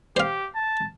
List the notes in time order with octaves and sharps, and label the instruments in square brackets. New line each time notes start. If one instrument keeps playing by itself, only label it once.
[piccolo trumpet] G4 [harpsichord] C5 F5
[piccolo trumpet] A5